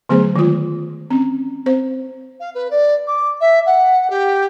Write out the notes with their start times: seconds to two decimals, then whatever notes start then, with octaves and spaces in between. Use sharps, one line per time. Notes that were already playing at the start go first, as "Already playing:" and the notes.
0.09 D3 F#3 A3 B3 G#4 C5
0.36 D#3 G#3 F4
1.11 C4 C#4
1.66 C4 C5
2.40 F5
2.55 B4
2.71 D5
3.07 D6
3.41 E5
3.66 F#5
4.10 G4